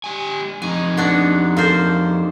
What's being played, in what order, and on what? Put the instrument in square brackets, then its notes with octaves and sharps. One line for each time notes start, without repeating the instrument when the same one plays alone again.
[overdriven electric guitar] G3 G#5
[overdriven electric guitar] F2 D#4 [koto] G#5
[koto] B3 D4 F#4
A#3 A4 C5